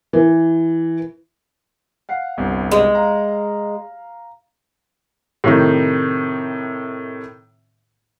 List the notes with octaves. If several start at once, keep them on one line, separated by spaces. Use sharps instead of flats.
E3
F5 F#5 C7
G1 C2
G#3
F5 A#5
A2 C3 D#3